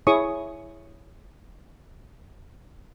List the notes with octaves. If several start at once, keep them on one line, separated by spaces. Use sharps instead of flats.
E4 G#4 C#5 C#6 D#6